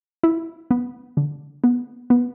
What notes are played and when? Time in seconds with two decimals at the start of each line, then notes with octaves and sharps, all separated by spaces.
0.23 E4
0.71 B3
1.17 D3
1.64 B3
2.10 B3